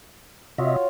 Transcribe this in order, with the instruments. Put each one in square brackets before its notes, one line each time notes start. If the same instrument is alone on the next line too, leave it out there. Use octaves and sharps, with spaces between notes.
[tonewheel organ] C3 D#5 E5 [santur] F4 F#4 C#5